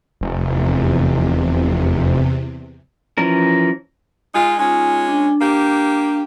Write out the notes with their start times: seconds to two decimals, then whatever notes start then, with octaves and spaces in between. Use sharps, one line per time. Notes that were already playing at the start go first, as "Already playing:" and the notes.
0.21 F1 E2 C3
3.18 E3 F3 C#4 A#4
4.34 G#3 D#4 F4
4.59 G#3 C#4 D#4 F4
5.08 D4
5.41 A#3 G4